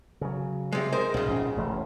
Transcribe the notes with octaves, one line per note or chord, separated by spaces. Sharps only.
C#3 F#3
C3 G#3
G#3 A#4 C5
B1 G#2 C#3
A#1 D#3 C#4
E1 A1 A3